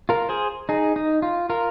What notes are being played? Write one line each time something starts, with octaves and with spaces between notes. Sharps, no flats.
F4 A#4
G#4 C5
D#4 G#4
D#4
F4
F4 A#4